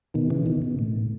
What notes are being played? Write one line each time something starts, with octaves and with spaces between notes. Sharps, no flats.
B2 D#3
C#3 E3
B2 D#3
B2
A2